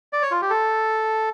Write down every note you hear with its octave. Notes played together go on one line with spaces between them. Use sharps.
D5
C#5
F4
G4
A4